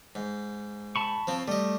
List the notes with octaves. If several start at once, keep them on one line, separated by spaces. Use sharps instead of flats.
G#2
A5 B5 C#6
F3 C4
G3 A3 D#5